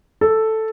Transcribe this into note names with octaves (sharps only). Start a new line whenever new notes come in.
A4